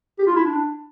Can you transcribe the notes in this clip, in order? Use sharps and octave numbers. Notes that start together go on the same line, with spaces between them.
G4
F4
E4
D4